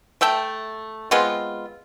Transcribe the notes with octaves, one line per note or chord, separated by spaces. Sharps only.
A3 E5 G5 A5
G#3 B3 C4 F4